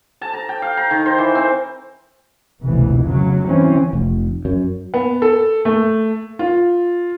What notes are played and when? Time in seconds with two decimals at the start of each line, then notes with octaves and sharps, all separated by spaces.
0.21 A5
0.33 A#5
0.49 G5
0.62 F5
0.77 A#5
0.91 D#3
1.06 C5
1.18 E3
1.35 C4
2.60 F1 C#2 B2 E3
3.02 F#2 C#3 F#3
3.46 G2 E3 C4 C#4
3.93 F1
4.45 F#2
4.94 B3
5.22 A4
5.65 A3
6.39 F4